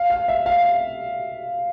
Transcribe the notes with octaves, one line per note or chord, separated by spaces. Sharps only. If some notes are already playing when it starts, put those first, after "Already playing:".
Already playing: F5
F5
E5
F5